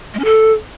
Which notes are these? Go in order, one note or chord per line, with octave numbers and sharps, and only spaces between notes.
G#3
C#4
A4